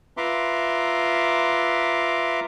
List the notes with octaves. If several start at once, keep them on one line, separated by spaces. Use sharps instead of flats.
F4 B4 E5 A#5 C6 D6